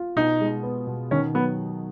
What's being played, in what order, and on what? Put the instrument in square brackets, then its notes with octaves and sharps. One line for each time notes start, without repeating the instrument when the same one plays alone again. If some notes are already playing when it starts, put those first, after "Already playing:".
Already playing: [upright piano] F4
[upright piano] B2 [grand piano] D#4
[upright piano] G#3
B3
B2
[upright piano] D#3 [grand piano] C#4
[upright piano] F#3 [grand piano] B3